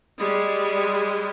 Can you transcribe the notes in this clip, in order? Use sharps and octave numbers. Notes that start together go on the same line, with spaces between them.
G3 G#3